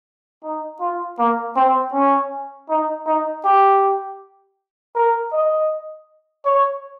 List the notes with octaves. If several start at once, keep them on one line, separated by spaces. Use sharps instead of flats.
D#4
F4
A#3
C4
C#4
D#4
D#4
G4
A#4
D#5
C#5